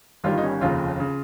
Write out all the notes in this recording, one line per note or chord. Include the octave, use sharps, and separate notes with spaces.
G1 G2 D#3 G3 F4
D#4
C#4
F1 D#2 C#3 F4
C#3